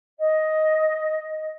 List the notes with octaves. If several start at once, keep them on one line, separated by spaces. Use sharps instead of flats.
D#5